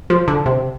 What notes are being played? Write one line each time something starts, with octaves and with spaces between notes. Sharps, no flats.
F3
D3
C3